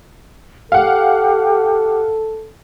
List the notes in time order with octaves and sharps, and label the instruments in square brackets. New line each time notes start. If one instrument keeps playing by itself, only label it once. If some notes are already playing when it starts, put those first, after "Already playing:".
[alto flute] G4 [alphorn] A4 [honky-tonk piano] F5 F#5